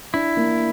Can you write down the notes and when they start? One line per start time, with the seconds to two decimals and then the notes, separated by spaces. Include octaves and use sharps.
0.13 D4 E4
0.37 A#3